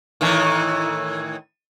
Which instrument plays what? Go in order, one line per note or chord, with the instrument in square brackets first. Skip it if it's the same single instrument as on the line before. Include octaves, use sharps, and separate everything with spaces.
[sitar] A2 D#3 E3